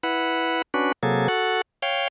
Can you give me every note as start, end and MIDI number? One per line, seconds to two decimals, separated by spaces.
0.03 0.62 64
0.03 0.62 71
0.03 0.62 78
0.74 0.92 61
0.74 0.92 62
0.74 0.92 66
0.74 0.92 71
1.03 1.28 48
1.03 1.28 54
1.03 1.28 58
1.03 1.28 68
1.03 1.28 69
1.28 1.61 66
1.28 1.61 69
1.28 1.61 78
1.82 2.08 73
1.82 2.08 77
1.82 2.08 79